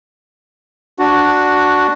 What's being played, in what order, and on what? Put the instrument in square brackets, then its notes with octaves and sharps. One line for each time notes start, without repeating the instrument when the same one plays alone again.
[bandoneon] D4 F#4